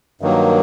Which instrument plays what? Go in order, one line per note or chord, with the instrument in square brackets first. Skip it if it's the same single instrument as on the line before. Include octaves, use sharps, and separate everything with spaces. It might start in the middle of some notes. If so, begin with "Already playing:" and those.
[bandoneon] G2 D#3 F#3 A#3